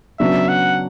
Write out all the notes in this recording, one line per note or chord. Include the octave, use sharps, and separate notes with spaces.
C#3 F#3 B3 D4 E5
F#5